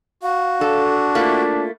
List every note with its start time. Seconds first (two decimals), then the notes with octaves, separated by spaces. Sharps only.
0.23 F#4 F5
0.61 D4 A4
1.15 A3 A#3 E4 F4